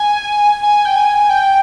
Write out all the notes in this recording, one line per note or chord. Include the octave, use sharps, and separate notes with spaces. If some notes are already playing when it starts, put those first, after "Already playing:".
Already playing: G#5
G#5
G5
G#5
G5